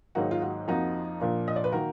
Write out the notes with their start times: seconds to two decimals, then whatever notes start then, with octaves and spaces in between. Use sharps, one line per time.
0.15 G#2 D#3 F#3 A#3 D#4 F#4
0.31 F4
0.42 F#4
0.68 F2 F3 A#3 D#4 F#4
1.20 A#2 F3 A#3 D4
1.48 D#5
1.56 D5
1.64 B4
1.72 D#3 A#3 F#4 A#4